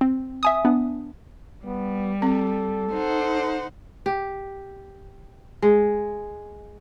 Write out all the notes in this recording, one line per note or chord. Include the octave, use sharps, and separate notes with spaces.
C4
E5 G#5 D#6
B3 D4
G3 B3
C4 A4
D#4 C5 F#5
G4
G#3